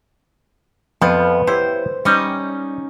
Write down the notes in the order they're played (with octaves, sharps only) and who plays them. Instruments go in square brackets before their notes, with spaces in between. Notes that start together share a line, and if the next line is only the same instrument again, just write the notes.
[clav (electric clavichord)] F2 F3 [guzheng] B3
[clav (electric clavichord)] E4 G4 C#5 [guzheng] C5
[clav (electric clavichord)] G3 [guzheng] C#4 D#4 D#5